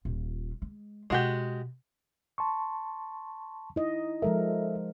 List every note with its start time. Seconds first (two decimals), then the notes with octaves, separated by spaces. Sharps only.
0.05 D#1 F4
0.62 G#3
1.10 B2 G#3 F#4 G4
2.38 A5 C6 C#6
3.76 D#4 E4 D#5
4.22 F3 G#3 A4 A#4 E5